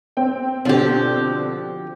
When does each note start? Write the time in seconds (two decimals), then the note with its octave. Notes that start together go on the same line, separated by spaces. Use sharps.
0.17 C4 G5
0.65 B2 D3 F3 C4 G4